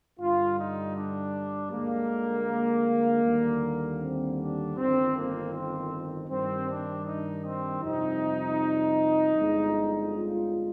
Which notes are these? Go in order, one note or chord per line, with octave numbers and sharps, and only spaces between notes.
G2 D3 G3 F4
D#4
D4
D2 D3 G#3 A#3
D#2 D3 G3
C4
D4
G1 F2 D#3 C4
A#3
C4
G2 D#3 G3 C4
D4
D#4
C4
F2 C3 G3 D#4
G1 F2 D3 G#3
F4